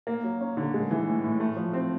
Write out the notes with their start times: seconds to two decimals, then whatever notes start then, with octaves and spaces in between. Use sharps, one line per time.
0.07 A#3
0.24 F#3
0.41 C#4
0.57 D3
0.74 G#3
0.91 E3
1.07 A2
1.24 A2
1.40 A3
1.56 F3
1.73 C4